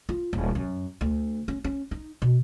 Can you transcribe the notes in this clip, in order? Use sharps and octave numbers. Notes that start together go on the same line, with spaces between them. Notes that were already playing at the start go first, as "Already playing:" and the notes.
F4
D#1
F#2
D2
C#4
C#4
D#4
B2